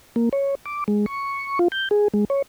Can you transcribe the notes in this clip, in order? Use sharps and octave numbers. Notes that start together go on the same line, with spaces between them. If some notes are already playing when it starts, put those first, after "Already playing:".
A#3
C#5
D6
G#3
C#6
F4
G6
G#4
G#3
C#5